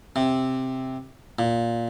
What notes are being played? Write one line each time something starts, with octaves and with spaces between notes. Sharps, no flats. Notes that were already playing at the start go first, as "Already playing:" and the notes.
C3
A#2